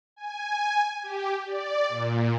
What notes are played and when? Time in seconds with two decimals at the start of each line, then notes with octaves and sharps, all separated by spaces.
0.16 G#5
1.03 G4
1.47 D5
1.89 A#2